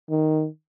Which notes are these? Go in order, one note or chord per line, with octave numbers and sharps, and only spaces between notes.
D#3